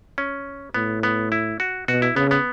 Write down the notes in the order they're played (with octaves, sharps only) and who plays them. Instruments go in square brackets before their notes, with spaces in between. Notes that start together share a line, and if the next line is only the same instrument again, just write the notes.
[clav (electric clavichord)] C#4
[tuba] A2 [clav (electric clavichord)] B3
[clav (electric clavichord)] B3
E4
F#4
[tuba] B2 [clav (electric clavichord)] F#4
[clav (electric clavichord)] E4
[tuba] C#3 [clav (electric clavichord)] B3
[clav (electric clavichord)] B3